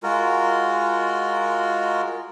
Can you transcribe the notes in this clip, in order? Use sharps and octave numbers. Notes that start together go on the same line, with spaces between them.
G#3 F4 F#4 A#4